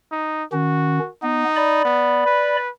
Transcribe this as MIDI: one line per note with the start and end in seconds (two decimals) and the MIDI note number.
0.12 0.44 63
0.53 0.99 51
0.53 0.99 61
0.53 1.09 66
1.23 1.44 59
1.23 1.82 63
1.56 2.57 74
1.56 2.57 83
1.85 2.25 59
2.26 2.70 71